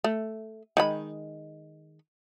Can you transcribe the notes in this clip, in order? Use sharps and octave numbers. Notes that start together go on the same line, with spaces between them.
A3
D#3 G#3 B5